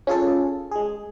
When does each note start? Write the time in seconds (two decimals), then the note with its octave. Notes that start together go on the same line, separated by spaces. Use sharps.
0.07 C#4 F4 G#4 A4
0.71 G#3 G#4